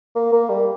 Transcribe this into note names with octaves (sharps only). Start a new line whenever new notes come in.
A#3
A#3
G3